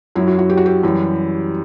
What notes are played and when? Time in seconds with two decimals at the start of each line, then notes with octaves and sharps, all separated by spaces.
0.16 F#2 F#3 E4
0.27 F#4
0.38 F#4
0.50 G4
0.57 F#4
0.66 G4
0.83 F#2 E3 G3